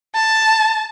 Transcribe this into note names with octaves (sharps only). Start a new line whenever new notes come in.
A5